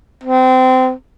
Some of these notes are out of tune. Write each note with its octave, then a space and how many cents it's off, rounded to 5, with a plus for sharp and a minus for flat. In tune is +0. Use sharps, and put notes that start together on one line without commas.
C4 -25